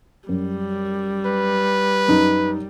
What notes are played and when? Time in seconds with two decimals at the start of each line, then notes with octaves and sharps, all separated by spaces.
0.29 F#2 G3
1.26 B4
2.08 F#2 D#4